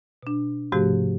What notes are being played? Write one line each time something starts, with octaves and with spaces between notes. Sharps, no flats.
B2 D4
G#2 C3 F3 A3 F#4 G4